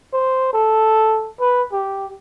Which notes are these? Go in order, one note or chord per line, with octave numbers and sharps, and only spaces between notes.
C5
A4
B4
G4